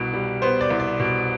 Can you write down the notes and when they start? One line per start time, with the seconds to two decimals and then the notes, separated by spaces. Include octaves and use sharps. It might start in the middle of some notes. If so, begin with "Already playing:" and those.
Already playing: C2 B2
0.13 G3
0.42 B3 C5
0.61 D5
0.70 C2
0.80 D5
1.00 B2